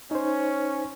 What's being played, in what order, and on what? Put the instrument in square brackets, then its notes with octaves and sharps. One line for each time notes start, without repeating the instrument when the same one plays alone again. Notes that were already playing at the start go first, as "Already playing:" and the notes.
[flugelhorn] C#4 [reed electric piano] D#4 C5